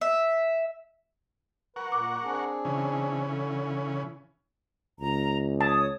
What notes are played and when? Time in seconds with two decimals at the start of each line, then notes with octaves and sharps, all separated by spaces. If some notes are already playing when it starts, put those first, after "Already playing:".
0.01 E5
1.76 A#4 B4 F#5 C#6
1.92 A#2 D6
2.24 C4 D4 G#4
2.65 C#3 E3 C#4
3.25 D3
5.00 C#2 A#5
5.61 C#5 A5 D#6